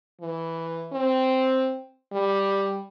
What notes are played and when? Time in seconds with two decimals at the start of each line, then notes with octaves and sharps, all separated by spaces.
0.21 E3
0.93 C4
2.13 G3